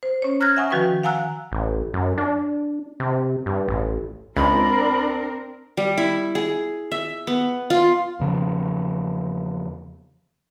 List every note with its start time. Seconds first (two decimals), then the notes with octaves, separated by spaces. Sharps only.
0.03 C5
0.22 C#4 C#5
0.40 A#5 F6 F#6 G#6 A#6
0.57 E5 F#5 G#5 C#6 D#6
0.70 D#3 F3 F#4 B4 G5 C#6
1.03 F5 F#5 G#5 A#5 E6 F#6
1.52 A1
1.94 F#2
2.18 D4
3.00 C3
3.46 G2
3.68 A1
4.37 C#2 C4 D4 A#4 B5
5.77 G3
5.98 E4
6.35 G#4
6.92 E5
7.27 B3
7.70 F4
8.20 E2 C#3 F3